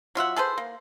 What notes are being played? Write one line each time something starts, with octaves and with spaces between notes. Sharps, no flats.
F#3 F4 E5 F#5
G#4 A4 B4 C5
A#3